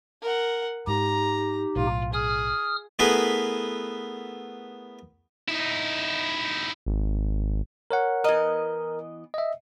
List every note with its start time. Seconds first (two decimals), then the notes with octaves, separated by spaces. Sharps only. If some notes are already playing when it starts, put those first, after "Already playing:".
0.22 A#4 F#5
0.87 G#2 D#4 G4 A#5
1.76 B1 A2 F4
2.13 G#4 D#6 F6
2.99 A3 B3 E4 G#4 A#4 B4
5.48 D#4 E4
6.86 G#1
7.91 A#4 C#5 F#5
8.24 E3 B3 A#4 D#5
9.34 D#5 E5